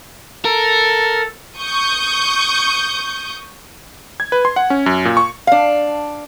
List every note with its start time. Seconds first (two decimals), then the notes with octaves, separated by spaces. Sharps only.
0.45 A4 A#4
1.58 C#6 D#6 G6
4.20 G#6
4.32 B4
4.45 C6
4.56 F#5
4.70 C#4
4.86 F#2
5.05 A#2
5.17 C#6
5.47 D4 F5